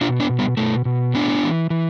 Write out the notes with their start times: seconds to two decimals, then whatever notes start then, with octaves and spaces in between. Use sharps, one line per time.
0.01 B2 D4 F4
0.20 B3 D4
0.30 B2
0.39 G3 B3
0.57 B2 A3
0.85 B2
1.14 A2 B3 D4
1.43 E3
1.70 E3